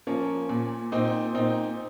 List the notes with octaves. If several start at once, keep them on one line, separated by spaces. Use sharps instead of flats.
F3 A#3 C#4
A#2
A#2 C4 D#4
A#2 C4 D#4